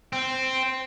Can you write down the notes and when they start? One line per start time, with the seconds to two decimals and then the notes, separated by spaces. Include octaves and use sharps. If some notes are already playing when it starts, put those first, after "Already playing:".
0.13 C4